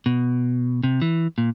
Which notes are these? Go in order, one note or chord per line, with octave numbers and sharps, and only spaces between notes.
B2
C3
E3
A#2